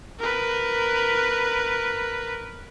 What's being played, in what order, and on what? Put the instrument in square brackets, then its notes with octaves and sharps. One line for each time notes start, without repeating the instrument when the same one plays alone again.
[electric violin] A#4 B4